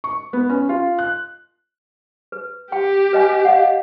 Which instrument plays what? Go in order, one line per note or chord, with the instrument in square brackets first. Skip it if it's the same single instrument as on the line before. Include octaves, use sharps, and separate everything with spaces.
[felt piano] C#6
B3
C#4
F4
F#6
[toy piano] B4
[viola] G4 [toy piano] G5
[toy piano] B4 D#5 G#5
D#5 F5 F#5